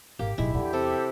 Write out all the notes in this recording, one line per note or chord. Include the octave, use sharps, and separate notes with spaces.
G#1 A#3 G4
D1 B1 G#3 E4
E2 D3 G4
C3 A4